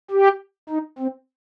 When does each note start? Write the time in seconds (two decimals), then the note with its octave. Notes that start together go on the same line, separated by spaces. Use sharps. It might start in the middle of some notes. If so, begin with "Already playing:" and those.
0.11 G4
0.69 D#4
0.99 C4